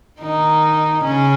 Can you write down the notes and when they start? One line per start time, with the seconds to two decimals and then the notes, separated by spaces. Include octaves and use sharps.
0.21 D#3 D#4
1.04 C#3 C#4